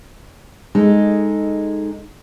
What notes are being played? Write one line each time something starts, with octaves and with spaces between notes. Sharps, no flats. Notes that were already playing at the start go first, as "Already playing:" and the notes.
G#3 D#4 A4